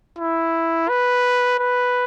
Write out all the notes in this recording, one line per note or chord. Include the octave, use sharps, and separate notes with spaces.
E4
B4
B4